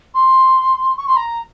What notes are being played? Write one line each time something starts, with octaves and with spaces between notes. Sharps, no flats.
C6
C#6
C6
A#5